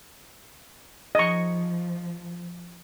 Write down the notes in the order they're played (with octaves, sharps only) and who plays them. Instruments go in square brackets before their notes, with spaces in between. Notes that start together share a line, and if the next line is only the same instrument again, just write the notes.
[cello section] F3 [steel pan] D#5 C#6